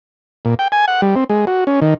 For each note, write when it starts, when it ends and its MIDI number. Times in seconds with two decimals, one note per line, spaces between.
0.45 0.55 46
0.59 0.68 79
0.72 0.86 80
0.88 1.01 78
1.02 1.15 55
1.16 1.24 60
1.29 1.45 56
1.47 1.64 66
1.67 1.80 61
1.82 1.94 51